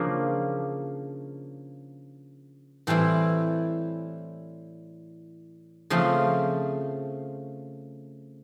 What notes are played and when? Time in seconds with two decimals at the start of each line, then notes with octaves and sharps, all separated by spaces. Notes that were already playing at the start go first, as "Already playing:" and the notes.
Already playing: C#3 F3 A#3 D4
2.87 A2 E3 G3 C4 E4
5.90 C#3 F3 A3 C4